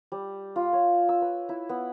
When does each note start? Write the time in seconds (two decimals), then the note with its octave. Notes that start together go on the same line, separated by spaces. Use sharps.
0.12 G3
0.56 F4
0.73 C#5
1.09 E6
1.22 B4
1.49 E4
1.69 B3